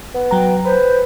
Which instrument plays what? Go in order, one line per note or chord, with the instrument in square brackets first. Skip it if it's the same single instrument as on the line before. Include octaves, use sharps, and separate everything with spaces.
[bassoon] B3
[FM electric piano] F#3 A#5 [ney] G5
[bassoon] B4 [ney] C5